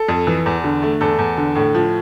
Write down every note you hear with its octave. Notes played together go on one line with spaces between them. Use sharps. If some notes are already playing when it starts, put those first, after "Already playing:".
Already playing: A4
F2
E3
E2
D3
A3
E2 A4
E2
D3
A2
F3